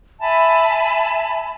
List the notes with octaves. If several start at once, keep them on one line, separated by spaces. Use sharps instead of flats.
E5 G#5 A5 B5